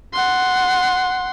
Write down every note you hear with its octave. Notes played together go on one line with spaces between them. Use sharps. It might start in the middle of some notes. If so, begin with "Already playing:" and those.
F#5 C6